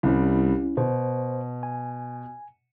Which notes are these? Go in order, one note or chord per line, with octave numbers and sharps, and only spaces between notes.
C2 G3 C#4 E4
B2 C5
G#5